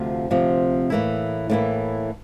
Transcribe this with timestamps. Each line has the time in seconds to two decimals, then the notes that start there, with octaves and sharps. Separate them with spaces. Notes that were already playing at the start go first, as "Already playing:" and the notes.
Already playing: D2 C3 F3 C4 F4
0.30 D2 C3 F3 C4 F4
0.90 A2 E3 A#3 E4
1.50 A2 E3 A#3 E4